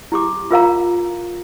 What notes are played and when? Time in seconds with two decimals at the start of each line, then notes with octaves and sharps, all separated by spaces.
0.12 E4 G4 D6
0.51 F4 A#4 F5 A#5